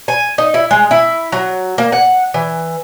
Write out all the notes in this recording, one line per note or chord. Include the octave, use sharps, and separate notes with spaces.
G#5
D#4
E4
G#3
E4
F#3
A#3
F#5
E3